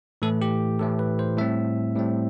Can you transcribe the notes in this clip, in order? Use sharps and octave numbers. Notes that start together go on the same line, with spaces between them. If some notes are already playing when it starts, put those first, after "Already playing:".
A2 E3 A3 A4
G4
A2 E3 A3 A4
B4
C5
A2 G3 C4 E5
A2 G3 C4